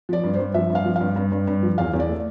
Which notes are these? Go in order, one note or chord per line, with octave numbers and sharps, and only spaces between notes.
F3 D5
G2
G2 C5
F3 E5
G2
F5
F3
F5
G2
G2
G2
G2
F3
E2 F5
E2
D5
A3